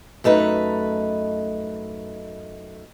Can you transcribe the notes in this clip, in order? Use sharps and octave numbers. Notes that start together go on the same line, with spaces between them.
F#2 A3 D#4 B4